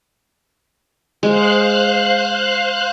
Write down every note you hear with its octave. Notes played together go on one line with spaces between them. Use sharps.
G#3 C5 F5 F#6